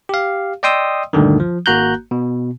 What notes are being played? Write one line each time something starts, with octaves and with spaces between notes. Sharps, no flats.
G4 F5
D5 D#5 G5 C6 D#6 E6
D2 G2 A#2 D3 D#3
F3
G#1 A#3 F#4 A#5 F#6 G6
B2